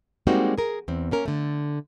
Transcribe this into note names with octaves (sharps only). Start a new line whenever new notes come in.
G3 G#3 A#3 C4 D#4 F#4
G#4 A#4
E2 C4
A#3 C#4 A#4
D3 A3